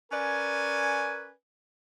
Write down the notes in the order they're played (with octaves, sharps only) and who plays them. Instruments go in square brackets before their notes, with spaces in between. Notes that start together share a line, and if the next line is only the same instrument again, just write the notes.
[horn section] C#4 A#4 B4 D5 G#5